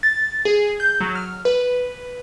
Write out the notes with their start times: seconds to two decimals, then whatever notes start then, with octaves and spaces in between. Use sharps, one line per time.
0.03 A6
0.45 G#4
0.80 G6
1.01 F#3
1.15 F6
1.45 B4